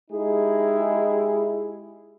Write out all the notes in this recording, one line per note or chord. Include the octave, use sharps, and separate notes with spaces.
G#3 D#4 E4 G4 G#4